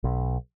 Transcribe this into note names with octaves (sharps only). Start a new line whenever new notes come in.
B1